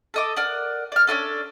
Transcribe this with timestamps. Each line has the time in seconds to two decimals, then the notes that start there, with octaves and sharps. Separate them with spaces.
0.14 A4 D#5 D6
0.37 A#4 D5 F#5
0.92 D5 F6
1.07 C#4 D4 F4 A4